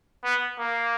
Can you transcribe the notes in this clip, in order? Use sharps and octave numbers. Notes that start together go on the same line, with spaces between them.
B3
A#3